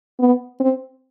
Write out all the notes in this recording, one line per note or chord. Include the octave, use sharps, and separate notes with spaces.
B3
C4